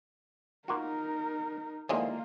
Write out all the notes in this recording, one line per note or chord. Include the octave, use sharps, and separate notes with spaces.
A#3 D#4 F4 F#4 A#4
D#2 D3 E3 F3 G#3 A#3 F4